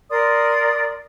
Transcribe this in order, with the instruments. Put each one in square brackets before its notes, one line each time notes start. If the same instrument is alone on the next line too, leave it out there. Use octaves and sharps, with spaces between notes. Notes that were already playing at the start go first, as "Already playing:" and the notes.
[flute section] A#4 D5 C6 D#6